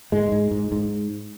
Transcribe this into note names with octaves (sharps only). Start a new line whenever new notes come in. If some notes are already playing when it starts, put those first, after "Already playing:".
G#2 G#3
G#2
G#2
G#2